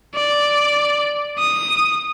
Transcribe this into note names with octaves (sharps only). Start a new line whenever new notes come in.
D5
D#6